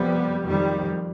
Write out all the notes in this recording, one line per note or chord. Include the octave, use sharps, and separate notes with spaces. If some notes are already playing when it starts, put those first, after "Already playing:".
Already playing: F2 C3 G3 B3
F2 D#3 G3